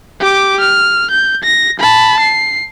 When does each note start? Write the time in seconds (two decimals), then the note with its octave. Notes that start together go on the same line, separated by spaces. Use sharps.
0.20 G4 D6
0.60 F6
1.11 G6
1.44 A#6
1.80 A5 B5
2.20 C7